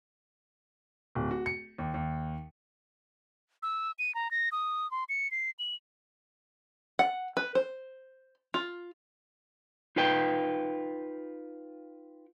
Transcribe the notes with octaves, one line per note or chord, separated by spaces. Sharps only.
D1
F#4
C#7
D#2
D#2
E6
D#7
A#5
A#6
D#6
C6
C#7
C7
F#7
F#5
B4
C5
F4
D#4 F4 B4 G5